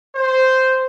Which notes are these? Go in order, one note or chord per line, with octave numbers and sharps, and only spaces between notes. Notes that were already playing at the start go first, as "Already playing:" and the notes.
C5